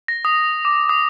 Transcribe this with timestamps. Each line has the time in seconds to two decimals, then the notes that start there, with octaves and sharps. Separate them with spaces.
0.08 A#6
0.25 D#6
0.65 D6
0.89 D#6